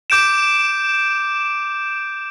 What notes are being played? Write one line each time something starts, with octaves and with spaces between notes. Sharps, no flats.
D6 G6 D7 E7